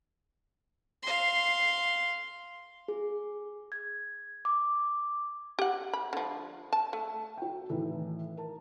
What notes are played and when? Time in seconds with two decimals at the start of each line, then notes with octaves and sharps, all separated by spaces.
1.02 F5 C6
2.88 G#4
3.72 G#6
4.45 D6
5.59 G4 F#5
5.93 B5
6.13 D3 F3
6.73 A5
6.93 A3
7.37 F#4 G5
7.69 A2 D#3 E3 A4
8.37 A#4 A5